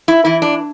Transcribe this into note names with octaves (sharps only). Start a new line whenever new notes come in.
E4
E3 E4
D4